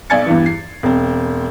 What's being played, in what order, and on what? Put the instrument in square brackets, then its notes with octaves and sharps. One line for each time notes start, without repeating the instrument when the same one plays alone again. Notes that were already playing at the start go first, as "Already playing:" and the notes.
[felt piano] B1 D5 G#5 G#6 A6 C#7
E2 G2 E3
C7
E1 C4